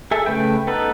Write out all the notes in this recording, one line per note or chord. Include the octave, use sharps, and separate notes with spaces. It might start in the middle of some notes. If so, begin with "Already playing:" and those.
G#4 A4 E5
C#3 A3 B4 G5
B3 D#4 A4 B4